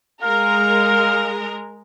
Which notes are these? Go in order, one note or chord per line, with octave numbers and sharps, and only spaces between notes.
G#3 A#4 F5